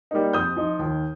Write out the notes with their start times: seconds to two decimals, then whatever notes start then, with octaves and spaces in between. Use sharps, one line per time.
0.11 G3 A#3 D#4
0.33 F2 D#6 G6
0.56 F3 D#4
0.79 D#2